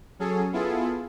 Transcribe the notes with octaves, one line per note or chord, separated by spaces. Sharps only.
F#3 C#4 G#4 A4
B3 E4 F4 G#4 A4